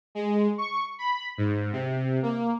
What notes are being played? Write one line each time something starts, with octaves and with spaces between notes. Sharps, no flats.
G#3
C#6
B5
G#2
C3
A#3